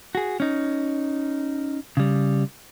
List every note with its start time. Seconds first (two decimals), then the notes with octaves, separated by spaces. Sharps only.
0.15 F#4 G#4
0.40 C#4 D#4
1.97 C#3 G3